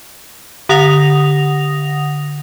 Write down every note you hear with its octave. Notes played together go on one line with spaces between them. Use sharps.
D3 F#5 D#6 A#6 F7